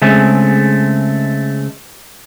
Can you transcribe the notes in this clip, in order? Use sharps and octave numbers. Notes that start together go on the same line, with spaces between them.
C#3 G#3 A3 C4